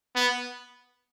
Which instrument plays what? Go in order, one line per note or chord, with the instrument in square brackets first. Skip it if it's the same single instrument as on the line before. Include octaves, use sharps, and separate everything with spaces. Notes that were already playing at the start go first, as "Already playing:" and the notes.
[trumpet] B3